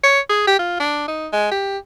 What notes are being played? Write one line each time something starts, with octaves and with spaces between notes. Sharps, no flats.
C#5
G#4
G4
F4
D4
D#4
G#3
G4